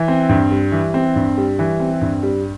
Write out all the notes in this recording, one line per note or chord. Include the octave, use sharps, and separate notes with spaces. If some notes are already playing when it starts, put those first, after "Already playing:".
Already playing: E3
C4
G2
G3
E3
C4
G2
G3
E3
C4
G2
G3